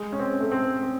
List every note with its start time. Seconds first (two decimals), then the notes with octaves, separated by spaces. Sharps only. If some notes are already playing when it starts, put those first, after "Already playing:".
Already playing: G#3
0.12 C#4
0.19 C4
0.40 A3
0.52 C4
0.83 C4